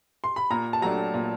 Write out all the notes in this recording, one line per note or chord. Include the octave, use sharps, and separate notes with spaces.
C6
B5
A#2 A#5
A5
F#3 A3 D4 A#5
A#2